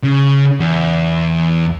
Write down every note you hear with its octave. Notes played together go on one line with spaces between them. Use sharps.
C#3
E2